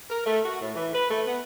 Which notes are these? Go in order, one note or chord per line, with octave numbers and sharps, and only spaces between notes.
A#4
A3
F#4
A2
E3
B4
A3
B3